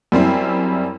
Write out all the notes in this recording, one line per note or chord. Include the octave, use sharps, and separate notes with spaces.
F#2 G3 C4 E4